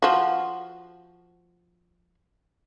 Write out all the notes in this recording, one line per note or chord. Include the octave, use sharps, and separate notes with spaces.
F3 F#4